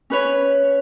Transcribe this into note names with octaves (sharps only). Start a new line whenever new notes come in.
C#4 B4 C#5